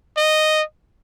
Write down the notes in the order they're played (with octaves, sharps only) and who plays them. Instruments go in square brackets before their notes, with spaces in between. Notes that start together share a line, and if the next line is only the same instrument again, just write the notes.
[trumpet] D#5